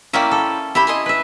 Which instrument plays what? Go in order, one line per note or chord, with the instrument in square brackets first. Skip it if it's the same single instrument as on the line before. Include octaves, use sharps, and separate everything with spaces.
[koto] A#3 C#4 E5 [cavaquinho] E4 D5 G5
[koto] A4
[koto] E4 [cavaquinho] G4 G5 B5
[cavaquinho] D#5 G#5 C6
[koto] B4 E5